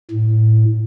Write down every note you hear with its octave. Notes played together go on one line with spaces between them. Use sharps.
A2